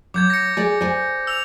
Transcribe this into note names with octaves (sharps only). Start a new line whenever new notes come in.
F#3 D6 G6 G#6
A#6 C#7
G#4 D5 G#5
C5 D5 G#5
E6 F7